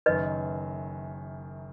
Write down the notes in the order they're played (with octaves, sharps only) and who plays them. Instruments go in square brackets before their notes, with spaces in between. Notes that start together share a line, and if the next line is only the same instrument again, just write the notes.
[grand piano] F#1 F#2 D#3 [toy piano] B4 D#5